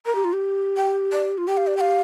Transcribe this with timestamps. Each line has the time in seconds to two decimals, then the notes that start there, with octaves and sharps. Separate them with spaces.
0.06 A#4 A#5
0.15 G4
0.25 F4
0.33 G4
0.77 G5
1.12 D5
1.38 F4
1.47 G4 G5
1.57 F5
1.67 D5
1.77 G5
1.81 F5